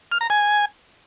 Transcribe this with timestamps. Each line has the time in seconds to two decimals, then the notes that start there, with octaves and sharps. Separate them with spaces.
0.12 F6
0.21 A#5
0.30 G#5